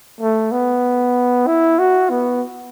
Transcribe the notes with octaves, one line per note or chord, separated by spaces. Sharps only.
A3
B3
E4
F#4
B3